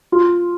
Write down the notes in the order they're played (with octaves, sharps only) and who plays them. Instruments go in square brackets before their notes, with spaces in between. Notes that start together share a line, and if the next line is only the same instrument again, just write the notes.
[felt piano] F4